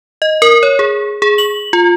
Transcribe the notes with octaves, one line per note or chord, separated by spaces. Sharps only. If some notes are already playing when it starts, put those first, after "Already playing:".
D#5
A#4
C#5
G#4
G#4
F#7
F4